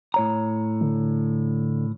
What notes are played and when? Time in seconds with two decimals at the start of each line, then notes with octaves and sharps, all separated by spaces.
0.14 A2 C#5 A#5
0.81 D3